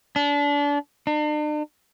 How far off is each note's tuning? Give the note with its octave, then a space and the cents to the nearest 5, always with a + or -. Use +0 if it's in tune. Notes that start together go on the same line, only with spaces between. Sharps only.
D4 -30
D4 +45